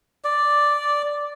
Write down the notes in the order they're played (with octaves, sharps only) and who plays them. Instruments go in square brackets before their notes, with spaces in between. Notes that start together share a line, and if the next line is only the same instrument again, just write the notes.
[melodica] D5